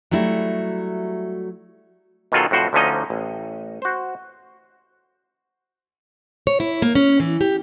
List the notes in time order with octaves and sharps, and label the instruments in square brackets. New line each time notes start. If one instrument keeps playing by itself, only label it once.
[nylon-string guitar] F#3 G3 A3 E4 F#4
[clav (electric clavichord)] B2 D#3 F#3 F4 G#4 A4
F2 A2 F#4 C5
D2 D3 F3 C#4 D#4 D#5
A1
F#4 C5
[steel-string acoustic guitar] C#5
E4
A#3
C#4
E3
G4